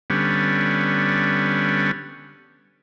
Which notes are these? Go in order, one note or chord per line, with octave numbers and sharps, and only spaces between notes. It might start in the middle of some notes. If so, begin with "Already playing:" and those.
D3 G3 B3 C#4